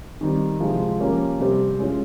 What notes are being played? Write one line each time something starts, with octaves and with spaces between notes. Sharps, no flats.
D#3 G3 C4
C3 F3 G#3 C4 F4
F3 A#3 C#4 G4
C3 G3 C4 G4 C5
G#3 C#4 F4